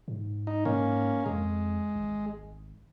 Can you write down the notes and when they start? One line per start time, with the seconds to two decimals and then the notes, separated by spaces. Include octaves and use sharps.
0.08 G#2
0.47 D#4
0.65 G#2 A#3 C#4
1.26 F2 G#3
1.95 G#1